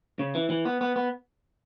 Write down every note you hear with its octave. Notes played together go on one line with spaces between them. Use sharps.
C#3
E3
E3
B3
B3
B3